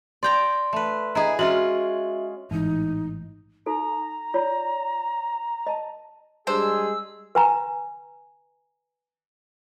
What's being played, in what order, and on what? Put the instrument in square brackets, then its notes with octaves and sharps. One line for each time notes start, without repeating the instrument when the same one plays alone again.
[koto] D5 G5 A#5 [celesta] C6
[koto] A3 B4
[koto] E4 G#4 [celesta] D#5 A#5
[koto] G#3 C#4 F4 [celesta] F#4 E5 F#7
[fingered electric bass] A1 E3 [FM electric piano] G#2 [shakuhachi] D#4
[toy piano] D#4 F#4 A4 [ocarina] A#5
[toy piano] F4 C#5 D5
D#5 A5
[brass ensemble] G3 G#3 G#4 [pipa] D4 C5 [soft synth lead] E6
[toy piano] B4 G#5 A#5